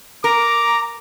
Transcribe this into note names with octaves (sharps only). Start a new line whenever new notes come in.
A#4 A#5 D6